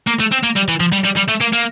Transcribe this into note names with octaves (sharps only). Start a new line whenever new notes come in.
A#3
A3
C4
A#3
G3
E3
F3
G3
G3
G3
A3
A#3
A#3